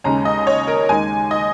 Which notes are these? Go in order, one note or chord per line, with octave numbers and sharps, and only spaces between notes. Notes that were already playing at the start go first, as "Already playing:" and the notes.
D#2 C#3 G#3 C#4 A#5
D#5
C#5
A#4
D#2 D#3 G#3 D#4 G#5
D#5